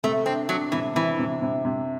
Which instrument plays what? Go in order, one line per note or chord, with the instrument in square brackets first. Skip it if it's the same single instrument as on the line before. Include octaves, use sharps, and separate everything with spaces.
[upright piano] C3 [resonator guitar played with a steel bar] A3
[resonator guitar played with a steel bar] C4 [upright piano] D4
[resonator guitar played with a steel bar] F#3 [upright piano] D4
[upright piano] C3 [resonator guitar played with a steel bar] E3
[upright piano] C3 [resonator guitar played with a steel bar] E3
[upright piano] C3
C3
C3